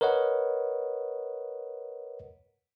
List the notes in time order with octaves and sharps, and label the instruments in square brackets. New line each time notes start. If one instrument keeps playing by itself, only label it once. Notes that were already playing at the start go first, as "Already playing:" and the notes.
[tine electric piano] A#4 B4 C#5 D#5 F#5